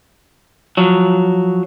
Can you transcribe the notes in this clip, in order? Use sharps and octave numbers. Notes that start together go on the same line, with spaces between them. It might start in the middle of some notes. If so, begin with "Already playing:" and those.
F3 F#3